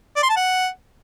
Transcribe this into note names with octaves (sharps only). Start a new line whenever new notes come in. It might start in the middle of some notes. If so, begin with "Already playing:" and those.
D5
C6
A5
F#5